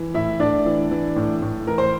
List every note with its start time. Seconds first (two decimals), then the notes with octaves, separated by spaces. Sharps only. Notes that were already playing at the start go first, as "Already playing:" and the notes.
Already playing: E3
0.14 A2 E4 E5
0.40 A2 D4 D5
0.66 E3
0.91 E3
1.16 A2
1.42 A2
1.67 E3 A#4
1.78 C5